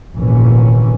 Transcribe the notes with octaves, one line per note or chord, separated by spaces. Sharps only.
F1 A#1 G#2 D#3 E3 C#4